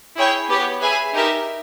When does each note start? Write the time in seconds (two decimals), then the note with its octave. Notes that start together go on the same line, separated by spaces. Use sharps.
0.17 E4 G#4 C#5 G5
0.48 B3 G4 C#5
0.81 G#4 B4 E5 G#5
1.13 D#4 G4 A#4 E5